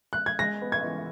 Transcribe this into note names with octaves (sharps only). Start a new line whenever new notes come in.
F#6
G#6
G#3 A#6
B3
G#6
E3